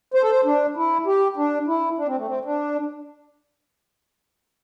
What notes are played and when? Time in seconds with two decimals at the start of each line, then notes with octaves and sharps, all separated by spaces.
0.14 C5
0.23 A4
0.31 C5
0.45 D4
0.76 E4
1.06 G4
1.37 D4
1.68 E4
1.98 D4
2.07 C4
2.17 A3
2.26 C4
2.45 D4